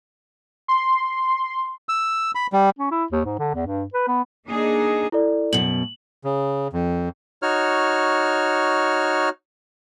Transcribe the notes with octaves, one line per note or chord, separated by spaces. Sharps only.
C6
E6
B5
G3
C#4
E4
D#2
G#2
D3
E2
G2
B4
B3
A#3 D4 D#4 G#4
E4 A4 D5
F#2 B2 F#7
C#3
F2
D#4 F#4 C#5 F6